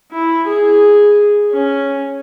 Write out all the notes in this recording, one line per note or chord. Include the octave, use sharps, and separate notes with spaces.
E4
G#4
C#4